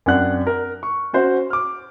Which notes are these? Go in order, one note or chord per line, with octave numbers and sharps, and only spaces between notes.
F#2 C4 D4 F#5 F#6
A#4
C#6
C#4 F#4 C5
D6 F6